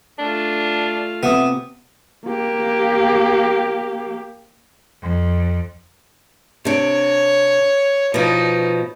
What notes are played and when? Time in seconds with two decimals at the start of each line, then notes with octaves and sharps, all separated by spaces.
0.19 A3 D4 F4
1.23 C3 B3 E5 D#6
2.27 A#3 G4
5.02 F2
6.65 C3 D4 C#5
8.14 B2 F3 D#4